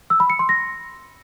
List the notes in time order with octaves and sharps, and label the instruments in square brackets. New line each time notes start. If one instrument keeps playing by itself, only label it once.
[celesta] E6
B5
C#7
C6
A#6